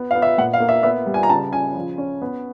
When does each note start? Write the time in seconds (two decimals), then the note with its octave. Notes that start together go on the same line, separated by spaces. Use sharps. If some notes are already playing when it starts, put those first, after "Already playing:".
Already playing: B3
0.11 B3 F5
0.22 E5
0.38 A#2 F#5
0.53 F5
0.60 A#3
0.69 E5
0.83 B3 E5
1.06 G3
1.14 G#5
1.23 A#5
1.29 C#3 A5
1.52 C#3 G#5
1.75 F3
1.98 C#4
2.22 B3